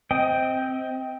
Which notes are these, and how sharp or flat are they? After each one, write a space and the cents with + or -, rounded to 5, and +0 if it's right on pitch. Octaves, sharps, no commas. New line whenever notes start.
C4 +0 D#5 +25 G5 +0